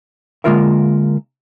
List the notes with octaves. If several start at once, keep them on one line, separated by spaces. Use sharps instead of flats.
D3 G#3 A#3 F4 A#4 E5